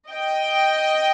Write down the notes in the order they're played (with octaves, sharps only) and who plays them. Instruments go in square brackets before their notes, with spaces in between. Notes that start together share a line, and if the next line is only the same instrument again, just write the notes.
[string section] D#5 G5